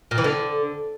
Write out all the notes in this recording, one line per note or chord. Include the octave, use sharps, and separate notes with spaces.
A#2
E3
D3